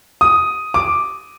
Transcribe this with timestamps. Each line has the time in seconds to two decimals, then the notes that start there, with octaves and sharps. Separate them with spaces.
0.21 D#6
0.74 D6